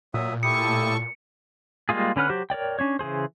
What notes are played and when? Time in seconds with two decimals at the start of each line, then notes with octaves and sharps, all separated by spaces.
0.14 A#2 F#3 E5 D#6
0.43 A2 E4 G4 A4 C#6 D#6 C#7
1.89 G3 G#3 A#3 F4 G#4
2.16 D3 C#4 B4 F#5 F6
2.29 F#3 G4 C5
2.50 A#4 C#5 D5 G5
2.79 C#4 D4 C#5
2.99 C#3 E3 G#4 C5